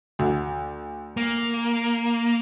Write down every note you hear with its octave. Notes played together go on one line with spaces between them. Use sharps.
D2
A#3